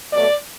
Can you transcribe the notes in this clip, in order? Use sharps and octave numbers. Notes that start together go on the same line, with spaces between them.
B2 F#3 A3 D5